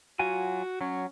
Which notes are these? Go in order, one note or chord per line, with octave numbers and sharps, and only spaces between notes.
F#3 F4 F#4 G#5
F#3 C#4